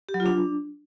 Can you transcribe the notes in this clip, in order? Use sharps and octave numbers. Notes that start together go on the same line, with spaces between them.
G4
F#3
F4
D4